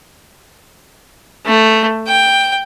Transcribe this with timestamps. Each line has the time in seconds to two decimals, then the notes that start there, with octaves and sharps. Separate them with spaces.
1.45 A3
2.07 G5